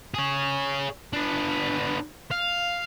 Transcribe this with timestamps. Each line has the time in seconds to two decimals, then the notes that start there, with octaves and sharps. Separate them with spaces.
0.14 G#4 C#5
1.13 B3 D4
2.31 F5